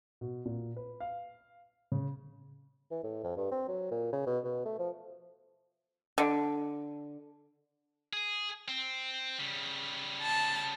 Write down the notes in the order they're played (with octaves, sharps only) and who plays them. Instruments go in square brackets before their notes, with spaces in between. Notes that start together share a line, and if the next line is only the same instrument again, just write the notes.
[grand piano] B2
A#2
B4
F5
C#3
[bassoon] E3
A2
F2
G2
C4
F#3
A#2
C#3
B2
B2
A3
F3
[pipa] D3
[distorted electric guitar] G#4
C4
C#3 G3
[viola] A5